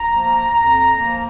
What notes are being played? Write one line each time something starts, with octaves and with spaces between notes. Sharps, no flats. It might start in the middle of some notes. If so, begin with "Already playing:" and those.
Already playing: A#5
F3 A#3
F2
F3 A#3